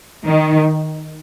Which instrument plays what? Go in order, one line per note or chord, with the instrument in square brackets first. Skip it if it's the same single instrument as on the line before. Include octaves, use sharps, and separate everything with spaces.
[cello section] D#3